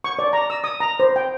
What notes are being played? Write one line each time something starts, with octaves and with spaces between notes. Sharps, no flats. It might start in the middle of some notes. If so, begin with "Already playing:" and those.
C#6
D5
A#5
E6
D#6
A#5
C5
G5